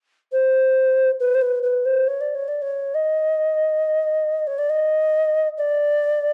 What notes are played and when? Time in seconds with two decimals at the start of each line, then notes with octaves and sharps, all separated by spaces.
0.32 C5
1.20 B4
1.35 C5
1.41 B4
1.63 B4
1.85 C5
2.07 C#5
2.21 D5
2.35 C#5
2.48 D5
2.62 C#5
2.95 D#5
4.47 C#5
4.58 D5
4.70 D#5
5.58 D5